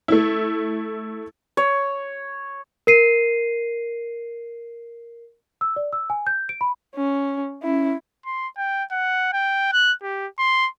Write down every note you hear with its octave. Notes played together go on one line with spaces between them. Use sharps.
A3 E4
C#5
A#4 C7 D#7
E6
D5
E6
G#5
G6
D7
B5
C#4
C#4 E4
C6
G5
F#5
G5
F#6
G4
C6